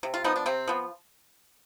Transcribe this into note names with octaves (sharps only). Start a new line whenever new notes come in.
C3
F4
F3 B3 D#4
D4
C3 C4
F3 B3